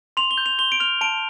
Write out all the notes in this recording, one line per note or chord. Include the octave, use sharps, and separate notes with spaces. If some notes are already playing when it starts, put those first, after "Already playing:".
C6 F7
G7
G6
F7
C6 G7
D7
F6 F7
A5 D7